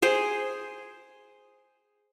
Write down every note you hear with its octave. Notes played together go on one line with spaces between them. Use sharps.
G#4 C5 G5